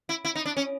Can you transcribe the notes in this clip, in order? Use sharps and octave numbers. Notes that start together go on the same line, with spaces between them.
E4
E4
D#4
D4
C#4